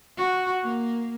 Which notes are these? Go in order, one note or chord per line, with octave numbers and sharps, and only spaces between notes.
F#4
A#3